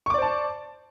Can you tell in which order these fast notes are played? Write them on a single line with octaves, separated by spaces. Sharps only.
C#6 D6 D5 C5 A5